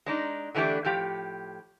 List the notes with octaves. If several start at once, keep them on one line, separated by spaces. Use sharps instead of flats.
G#3 D4 D#4
D3 E3 A3 D4 G4
A2 F3 G4